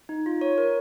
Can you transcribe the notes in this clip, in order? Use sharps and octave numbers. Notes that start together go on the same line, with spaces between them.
D#4
F4
C#5
A#4